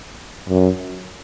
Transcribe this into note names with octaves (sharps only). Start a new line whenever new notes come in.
F#2